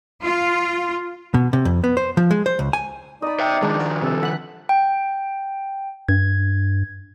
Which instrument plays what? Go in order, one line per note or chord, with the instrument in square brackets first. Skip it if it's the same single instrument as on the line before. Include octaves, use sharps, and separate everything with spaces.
[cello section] F4
[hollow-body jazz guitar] B2
C3
F2
B3
C5
F3
G#3
C5
C#2
G#5
[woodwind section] D#4 D5 [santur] D#5 B5
[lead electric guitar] E5 G5
[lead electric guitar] D#3 F3 [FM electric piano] G#3 [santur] D4
[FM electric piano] F#4 A#4
[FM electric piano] C3 [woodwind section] A4
[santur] F#5 [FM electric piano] B5 F#6
[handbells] G5
[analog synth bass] G2 [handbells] G#6